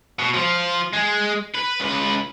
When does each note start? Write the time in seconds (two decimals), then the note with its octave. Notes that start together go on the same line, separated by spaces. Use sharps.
0.19 B2
0.34 F3 F4
0.93 G#3
1.54 B4
1.80 C#2 B4